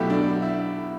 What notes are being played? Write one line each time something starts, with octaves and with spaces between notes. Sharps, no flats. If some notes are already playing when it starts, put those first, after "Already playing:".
Already playing: B1 B2 A3 E4 G4
D4
E4